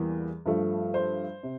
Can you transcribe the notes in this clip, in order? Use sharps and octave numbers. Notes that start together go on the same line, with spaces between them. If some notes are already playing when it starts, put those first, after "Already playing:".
Already playing: E2 E3 G3 A#3
G2 F3 A3
C5
C3